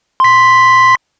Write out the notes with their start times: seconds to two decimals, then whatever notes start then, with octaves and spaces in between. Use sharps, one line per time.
0.20 C6 B6